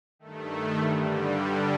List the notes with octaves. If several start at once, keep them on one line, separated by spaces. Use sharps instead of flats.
G2 D#3 A3
G2 D3 G3